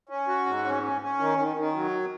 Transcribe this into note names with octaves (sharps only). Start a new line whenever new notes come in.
C#4
F#4
G#2
C#4
C#4
C#4
D#3
D#3
D#3
F#3